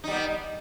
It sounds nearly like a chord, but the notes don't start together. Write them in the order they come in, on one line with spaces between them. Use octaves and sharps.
D#4 G3 B3